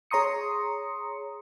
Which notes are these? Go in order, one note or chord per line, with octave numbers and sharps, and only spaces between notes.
G#4 C#5 A#5 C6 D#6 C#7